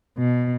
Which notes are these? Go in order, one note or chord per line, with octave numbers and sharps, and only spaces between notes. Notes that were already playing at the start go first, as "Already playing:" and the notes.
B2